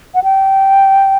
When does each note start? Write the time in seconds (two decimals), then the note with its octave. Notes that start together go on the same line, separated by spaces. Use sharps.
0.15 F#5
0.24 G5